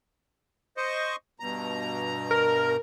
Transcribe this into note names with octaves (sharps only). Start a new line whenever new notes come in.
C5 D#5 C#6
G2 B2 A#5
A#4